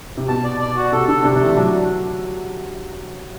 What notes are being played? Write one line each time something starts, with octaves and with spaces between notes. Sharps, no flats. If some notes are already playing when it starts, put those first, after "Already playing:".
C3
B2 A5
D5
D5
F#4
C3 A4
D3 A4
C3 D4
C3 A3
E3
F#3 D4